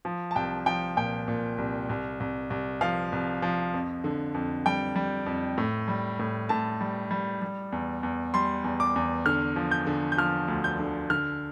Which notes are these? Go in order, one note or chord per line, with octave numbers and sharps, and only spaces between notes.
F3
A5
C2 G5
F3 G5
A#2 G5
A#2
C2
C2
C2
C2
F3 F5
C2
F3
F2
D3
F2
G3 G5
G3
F2
A2
G3
A2
A2 A5
G3
G3
G3
E2
E2
G3 C6
E2
D6
E2
D3 F6
F3
G6
D3
G6
F3 F6
D2
G6
D3
D3 F6